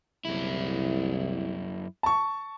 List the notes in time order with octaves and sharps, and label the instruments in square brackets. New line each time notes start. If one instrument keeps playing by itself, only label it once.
[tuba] C2 [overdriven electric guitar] F#2 E4
[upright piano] A5 C#6